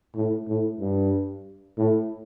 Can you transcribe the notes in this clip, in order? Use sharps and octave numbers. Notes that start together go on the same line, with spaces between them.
A2
A2
G2
A2